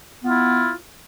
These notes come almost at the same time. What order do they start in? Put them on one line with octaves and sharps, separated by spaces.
B3 F4 E4